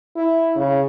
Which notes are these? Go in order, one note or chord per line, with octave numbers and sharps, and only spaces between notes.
E4
C#3